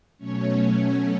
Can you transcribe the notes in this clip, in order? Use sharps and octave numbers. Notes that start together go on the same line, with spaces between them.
B2 F#3 A3 C#4 C#5